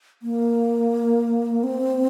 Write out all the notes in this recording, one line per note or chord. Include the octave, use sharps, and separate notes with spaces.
A#3
C4